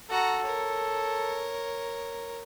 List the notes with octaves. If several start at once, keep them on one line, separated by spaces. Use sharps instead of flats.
F#4 A4 A#5
A#4 C#5